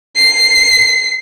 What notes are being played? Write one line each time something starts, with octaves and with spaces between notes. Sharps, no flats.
C7